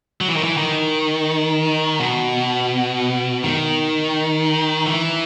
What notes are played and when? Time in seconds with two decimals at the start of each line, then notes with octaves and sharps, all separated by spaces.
0.21 F#3
0.28 E3
0.36 D#3
0.44 E3
0.57 D#3
2.00 B2
3.44 D#3
4.86 E3